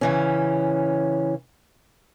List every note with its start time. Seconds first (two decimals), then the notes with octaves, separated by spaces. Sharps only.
0.01 C#3 E3 C#4